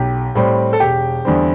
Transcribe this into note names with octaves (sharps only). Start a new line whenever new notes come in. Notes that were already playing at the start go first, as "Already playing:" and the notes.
Already playing: B1 G4
A2 G3 C4
A4
E1 G4
E2 D3 G3 C4